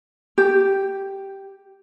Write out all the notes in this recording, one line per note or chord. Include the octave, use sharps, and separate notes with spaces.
G4